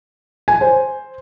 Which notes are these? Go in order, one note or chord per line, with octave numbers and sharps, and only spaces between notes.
G#5
C5